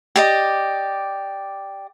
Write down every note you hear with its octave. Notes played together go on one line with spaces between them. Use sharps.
G4 D5 D#5